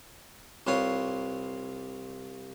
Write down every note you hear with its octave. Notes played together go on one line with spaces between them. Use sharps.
C2 C3 F4 B4 C#5 C6